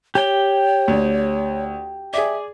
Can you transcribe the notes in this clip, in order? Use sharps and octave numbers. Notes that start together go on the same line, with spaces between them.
G4 C#5 G5
D2
G#4 D5 E5